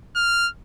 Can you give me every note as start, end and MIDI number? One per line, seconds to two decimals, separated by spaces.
0.16 0.49 89